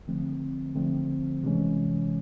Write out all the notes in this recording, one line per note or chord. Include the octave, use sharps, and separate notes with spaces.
D3 F3 A3 C4
D3 F3 A3 C4
C3 E3 G#3 C#4